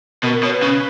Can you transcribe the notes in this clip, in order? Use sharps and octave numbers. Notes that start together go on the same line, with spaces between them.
B2 A#4
B2 C#5
B4
C#3